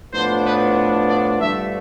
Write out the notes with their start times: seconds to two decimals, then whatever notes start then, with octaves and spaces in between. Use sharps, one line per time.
0.13 A2 F3 B3 D4 C5
0.45 B4
1.09 D5
1.41 G2 D3 F3 A3 E5